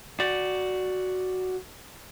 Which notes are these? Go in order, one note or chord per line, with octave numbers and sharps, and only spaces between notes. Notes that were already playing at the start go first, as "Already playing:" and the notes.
F#4 D5